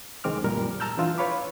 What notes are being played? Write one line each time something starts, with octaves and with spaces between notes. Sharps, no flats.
C2 D#3 G#3 C4 D6 F6
F#2 A#2 G3 A#4 F6
A5 A#5 E6 F6 G6
E3 D4 F4 E6
B4 C#5 F5 B5 D6